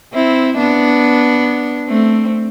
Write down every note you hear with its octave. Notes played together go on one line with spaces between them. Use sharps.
C4 E4
B3 D4
A3 C4